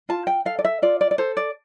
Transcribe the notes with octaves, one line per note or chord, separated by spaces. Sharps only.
F4 A5
G5
A4 F5
D5
E5
F4 D5
D5
D5
A4 C5
D5